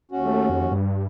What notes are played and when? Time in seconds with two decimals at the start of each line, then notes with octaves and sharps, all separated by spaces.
0.11 D#2 C#4 F#4
0.25 A3
0.50 F2
0.71 G2